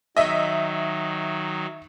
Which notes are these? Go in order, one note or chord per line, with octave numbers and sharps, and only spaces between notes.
D#3 F#3 D#5 E5